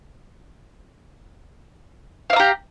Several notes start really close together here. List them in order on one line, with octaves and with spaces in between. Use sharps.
F5 E5 A#5 G4